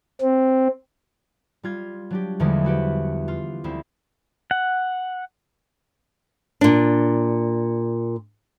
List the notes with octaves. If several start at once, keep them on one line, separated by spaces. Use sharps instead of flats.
C4
G3 F4 G#6
F#3 D4 G4
E2 D3 F3 G3 G#3 A#3
E4 F#4 G4 B4
F4
D2 C4 E4
F#5
A#2 D4